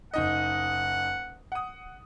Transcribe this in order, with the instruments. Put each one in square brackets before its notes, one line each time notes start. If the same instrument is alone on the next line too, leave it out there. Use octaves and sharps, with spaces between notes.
[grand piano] F#1 D#4 D#5 [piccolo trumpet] F#5
[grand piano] F#5 D#6